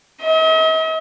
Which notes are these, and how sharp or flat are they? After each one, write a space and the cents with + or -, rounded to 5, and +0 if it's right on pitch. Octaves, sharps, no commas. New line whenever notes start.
D#5 +45